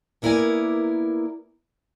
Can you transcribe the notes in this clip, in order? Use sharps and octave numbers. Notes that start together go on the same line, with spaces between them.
A#3 B3 E4 A#4 D5 G#5